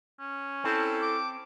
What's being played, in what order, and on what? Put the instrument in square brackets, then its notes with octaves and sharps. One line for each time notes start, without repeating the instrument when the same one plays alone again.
[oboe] C#4
[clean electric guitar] C4 [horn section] E4 A4
[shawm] D6